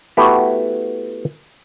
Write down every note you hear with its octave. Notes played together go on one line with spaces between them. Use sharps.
A3 B3 E4 F#4 G4